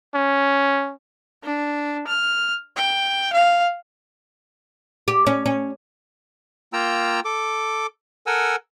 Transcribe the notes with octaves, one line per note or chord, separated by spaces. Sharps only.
C#4
D4
F6
G5
F5
G4
C#4
C#4
A#3 F4 G5 A#5 E6
A4 D6
A4 A#4 F#5 G#5 E6